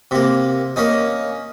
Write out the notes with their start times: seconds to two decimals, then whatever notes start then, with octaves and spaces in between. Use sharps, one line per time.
0.11 C3 A#3
0.76 A#3 C#4 D#4